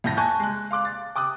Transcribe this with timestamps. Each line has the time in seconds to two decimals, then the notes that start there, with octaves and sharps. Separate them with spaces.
0.04 F2 A2 G6 A#6
0.17 G#5 A5 C#6 F#6 G6
0.40 G#3 F#6
0.71 F5 C6 D6 F#6
0.85 A6
1.16 G5 D6 D#6 F#6